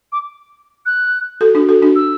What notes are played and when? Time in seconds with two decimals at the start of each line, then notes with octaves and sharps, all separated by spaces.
0.12 D6
0.86 F#6
1.41 F#4 A4
1.55 D4 F#4
1.69 F#4 A4
1.82 D4 F#4
1.96 E6